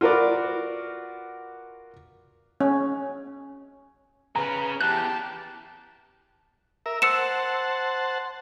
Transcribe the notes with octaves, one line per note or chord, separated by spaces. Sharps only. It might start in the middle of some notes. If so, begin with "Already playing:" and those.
F4 F#4 A#4 B4 D5
C#4
C#3 C#4 B4 A#5
E2 G4 A5 F#6
A#4 E5
C5 F#5 A5 E6 C#7 E7